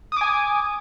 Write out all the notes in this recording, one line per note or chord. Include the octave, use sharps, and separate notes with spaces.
G#5 D6 D#6